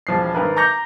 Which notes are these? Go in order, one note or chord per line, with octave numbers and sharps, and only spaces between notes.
E1 F3 C7
G#1 A#4 B4
A#5 D6 G6 A#6 C#7 F7